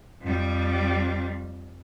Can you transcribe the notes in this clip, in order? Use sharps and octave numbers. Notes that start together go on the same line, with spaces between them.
F2 G3